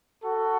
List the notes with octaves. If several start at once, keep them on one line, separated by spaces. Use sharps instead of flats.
F#4 A4